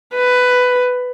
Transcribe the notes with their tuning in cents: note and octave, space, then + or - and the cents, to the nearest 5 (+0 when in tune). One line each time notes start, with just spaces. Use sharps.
B4 +10